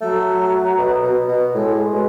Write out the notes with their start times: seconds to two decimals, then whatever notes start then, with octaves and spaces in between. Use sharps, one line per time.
0.01 F#3 A3
0.78 B2
1.03 B2
1.28 B2
1.54 A2 G#3
1.93 B2